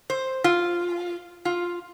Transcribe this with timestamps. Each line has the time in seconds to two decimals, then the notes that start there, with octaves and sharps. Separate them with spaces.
0.10 C5
0.44 F4
1.45 F4